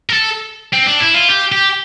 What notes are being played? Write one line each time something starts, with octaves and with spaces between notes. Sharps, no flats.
A#4
A4
C4
D4
E4
F4
G4
G4